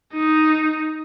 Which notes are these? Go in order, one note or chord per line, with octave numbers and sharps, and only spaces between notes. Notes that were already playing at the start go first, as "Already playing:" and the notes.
D#4